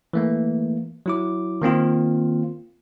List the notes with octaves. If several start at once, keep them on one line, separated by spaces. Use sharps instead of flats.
E3 A3 A#3
F#3 E4 D6
D#3 A#3 C4 F4